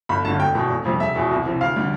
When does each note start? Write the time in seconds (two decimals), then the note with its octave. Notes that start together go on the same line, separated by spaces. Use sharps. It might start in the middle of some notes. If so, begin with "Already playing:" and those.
0.09 G1 B5
0.25 G2 D3 A5
0.40 F1 G5
0.55 E2 B2
0.70 F1
0.85 F2 C3 G3
1.00 E1 E5
1.16 E2 B2
1.31 C2
1.46 C3 E3
1.61 D2 F5
1.76 D3 G3